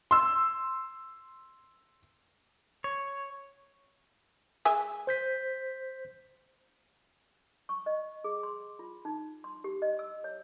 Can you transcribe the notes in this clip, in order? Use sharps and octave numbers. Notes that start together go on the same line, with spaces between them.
C6 E6
C#5
G#3 E5 G#5
C5 G6 B6
C#6
D#5
G#4
C6
F4
D#4
C6
G4
D#5
E6
C#5